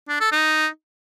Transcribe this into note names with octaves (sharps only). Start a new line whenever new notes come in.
D4
A4
D#4